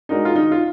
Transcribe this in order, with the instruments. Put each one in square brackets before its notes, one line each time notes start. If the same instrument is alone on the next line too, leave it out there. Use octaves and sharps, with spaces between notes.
[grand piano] G#3 D4 F#4 A#4 [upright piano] D#4
[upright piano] F4
[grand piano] D#3 [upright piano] D#4
[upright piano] F4